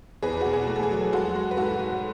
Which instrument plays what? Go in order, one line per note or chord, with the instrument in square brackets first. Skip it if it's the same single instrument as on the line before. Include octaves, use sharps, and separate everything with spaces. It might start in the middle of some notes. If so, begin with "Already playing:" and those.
[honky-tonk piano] E2 G#4 B4
F#4
B2
G#4
A3
A4
G#4
F#3
G#3 F#4 A4
G#3
B4
G#2 F#4 A4
G#2